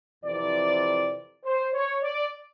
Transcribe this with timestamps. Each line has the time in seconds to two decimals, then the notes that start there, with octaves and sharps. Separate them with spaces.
0.24 F2 C3 E3 D5
1.44 C5
1.73 C#5
2.03 D5